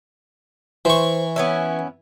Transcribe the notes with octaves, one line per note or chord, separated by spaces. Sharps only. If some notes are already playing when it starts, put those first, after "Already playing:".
E3 C5 C#6
B3 C#4 E4